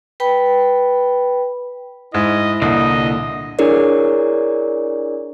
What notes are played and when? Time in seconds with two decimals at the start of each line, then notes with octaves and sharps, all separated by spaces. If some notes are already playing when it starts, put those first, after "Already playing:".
0.20 B4 G5 B5
2.14 G#2 E4 D#5
2.62 C2 A#2 D3 D#5
3.59 D4 E4 G#4 A#4 C#5 D5